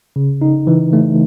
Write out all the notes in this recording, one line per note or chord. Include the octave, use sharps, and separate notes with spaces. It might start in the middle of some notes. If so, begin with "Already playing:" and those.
C#3
D#4
E3
A3